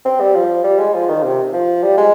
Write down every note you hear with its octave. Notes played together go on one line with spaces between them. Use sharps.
C4
G3
F3
G3
G#3
F3
D#3
C3
F3
G3
G#3